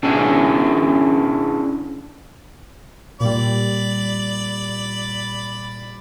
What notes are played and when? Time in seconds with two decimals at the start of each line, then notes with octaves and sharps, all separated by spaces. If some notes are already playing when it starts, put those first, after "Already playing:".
0.03 C#4 D4 E4 G#4
3.21 A#2 G3 D5 B5